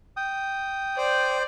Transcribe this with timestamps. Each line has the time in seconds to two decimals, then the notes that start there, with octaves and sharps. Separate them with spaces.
0.17 G5 D#6
0.98 C5 D5